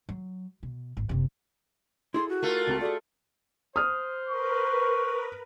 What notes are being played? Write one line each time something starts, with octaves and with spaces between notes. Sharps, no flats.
F#3
B2
G#1
F#1 C3
E4 G#4 A4 C6
F#4
A3 F4 A#4
C#2 C4 A#5
F#4 G#4 A4 D5
C5 D#6 F6
A#4 B4 C#6